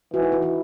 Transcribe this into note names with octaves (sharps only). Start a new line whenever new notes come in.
E3 F#4
D#4
E4
E4